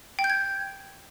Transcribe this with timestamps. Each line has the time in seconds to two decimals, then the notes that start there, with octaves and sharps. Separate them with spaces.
0.19 G5
0.24 G6
0.30 G#6